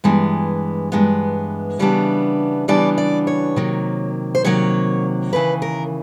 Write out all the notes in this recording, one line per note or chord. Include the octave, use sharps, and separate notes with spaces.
G2 E3 G#3 B3
G2 E3 G#3 B3
C#3 E3 G3 B3 D4
C#3 E3 G3 B3 D4 D5
D5
C#5
C3 D#3 F#3 A#3
C5
C3 D#3 F#3 A#3 C#5
D#2 C#3 E3 B4
A#4